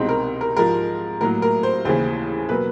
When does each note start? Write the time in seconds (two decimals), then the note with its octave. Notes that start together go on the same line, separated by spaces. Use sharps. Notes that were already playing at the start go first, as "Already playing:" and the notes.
Already playing: C2 B2 G#3 C4 D#4
0.09 A#4
0.41 A#4
0.56 G#2 F3 G#3 A#4
1.21 A2 F#3 A#3 A#4
1.42 A#4
1.63 C5
1.85 D#2 C#3 E3 C5
2.49 B2 F#3 A#3 B4